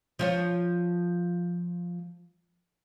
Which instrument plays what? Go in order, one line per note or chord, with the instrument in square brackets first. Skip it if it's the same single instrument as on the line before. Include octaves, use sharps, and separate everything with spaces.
[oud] F3 F4 C#5